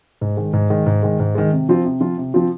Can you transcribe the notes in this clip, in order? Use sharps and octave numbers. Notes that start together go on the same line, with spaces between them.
G#2
D#3 G#3
G#2
D#3 G#3
G#2
D#3 G#3
G#2
D#3 G#3
C3
F3 C4 F4
C3
F3 C4 F4
C3
F3 C4 F4